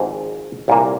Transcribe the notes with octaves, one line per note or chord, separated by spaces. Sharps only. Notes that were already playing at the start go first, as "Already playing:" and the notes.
Already playing: G#1 G#2 F3 C4
C2 A#2 A#3